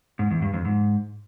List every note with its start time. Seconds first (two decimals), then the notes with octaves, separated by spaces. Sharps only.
0.19 G#2
0.31 E2
0.42 G2
0.53 F2
0.65 G#2